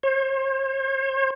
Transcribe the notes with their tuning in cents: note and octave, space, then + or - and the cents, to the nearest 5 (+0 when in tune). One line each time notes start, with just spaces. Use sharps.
C5 +45